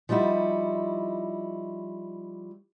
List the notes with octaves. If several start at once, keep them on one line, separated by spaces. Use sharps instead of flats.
F3 G3 D#4 E4 F#4